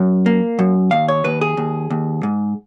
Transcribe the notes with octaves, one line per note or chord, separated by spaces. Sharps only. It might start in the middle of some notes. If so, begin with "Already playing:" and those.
Already playing: F#2
A#3
F#2
D#2 F5
C#5
D#2 B4
G#4
D#2
D#2
G#2